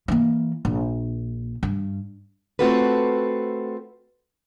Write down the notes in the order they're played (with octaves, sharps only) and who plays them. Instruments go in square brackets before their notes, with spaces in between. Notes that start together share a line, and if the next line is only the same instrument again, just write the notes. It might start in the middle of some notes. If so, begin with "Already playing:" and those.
[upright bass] E3 A#3
A#1
G2
[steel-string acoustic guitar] A3 C4 F4 F#4 A4 B4